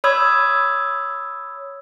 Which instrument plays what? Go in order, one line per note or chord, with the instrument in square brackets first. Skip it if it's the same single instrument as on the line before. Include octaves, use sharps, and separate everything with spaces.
[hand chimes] C#5 B5 D#6 E6 G#6